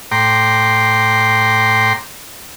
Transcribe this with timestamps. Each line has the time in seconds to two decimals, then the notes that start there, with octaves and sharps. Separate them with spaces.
0.11 A2 G5 A#5 C6 D6